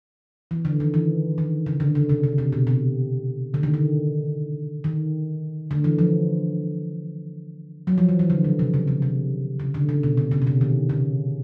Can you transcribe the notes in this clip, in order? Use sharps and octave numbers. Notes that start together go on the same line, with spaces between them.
E3
D3
D#3
E3
D#3
C#3
D3
C#3
C3
C3
C3
B2
C3
D3
D#3
D3
D#3
D3
E3
F3
F#3
F3
E3
E3
D3
C#3
C3
C#3
C3
C3
C#3
D3
C#3
B2
C3
C#3
B2
C3
D#3
C#3